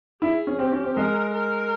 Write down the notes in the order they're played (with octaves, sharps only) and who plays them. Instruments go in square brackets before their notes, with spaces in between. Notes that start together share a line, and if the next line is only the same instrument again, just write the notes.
[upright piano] E4 [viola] G#4
[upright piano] C#4
[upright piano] C4 [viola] G4
[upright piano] C#4
C4
[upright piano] G#3 [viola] A#4
[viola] A#4